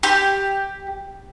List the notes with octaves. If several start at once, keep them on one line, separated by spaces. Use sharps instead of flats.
G4